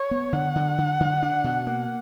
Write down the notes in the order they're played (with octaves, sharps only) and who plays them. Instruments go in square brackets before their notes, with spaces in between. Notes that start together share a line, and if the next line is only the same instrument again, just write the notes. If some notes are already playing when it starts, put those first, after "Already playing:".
Already playing: [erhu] C#5
[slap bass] B3
[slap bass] D3 [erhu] F#5
[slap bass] D3
D3
D3
D4
B2
A#3